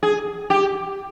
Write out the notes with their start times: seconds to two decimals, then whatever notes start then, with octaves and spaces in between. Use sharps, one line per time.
0.03 G#4
0.50 G4